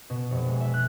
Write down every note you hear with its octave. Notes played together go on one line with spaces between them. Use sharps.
B2
F1
G#3
E5
F#6